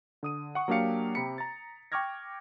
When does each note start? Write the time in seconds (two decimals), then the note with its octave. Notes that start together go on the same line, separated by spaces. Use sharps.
0.23 D3 D#6 D#7
0.55 F#5 C#6
0.68 F#3 A#3 D4 G4 F5 C#7
1.15 C3 G4 A#5 B5 B6 C#7
1.38 A#5 A6
1.92 G5 C#6 D6 F6 G#6 A#6